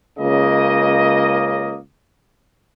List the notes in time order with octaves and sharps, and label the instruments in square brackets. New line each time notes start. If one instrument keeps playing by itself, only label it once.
[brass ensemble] C#2 C#3 A#3 D#5